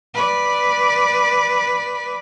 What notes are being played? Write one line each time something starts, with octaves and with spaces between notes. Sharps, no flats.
B4 D5